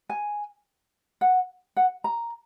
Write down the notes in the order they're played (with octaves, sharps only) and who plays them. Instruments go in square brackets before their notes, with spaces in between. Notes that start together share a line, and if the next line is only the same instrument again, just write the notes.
[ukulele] G#5
F#5
F#5
A#5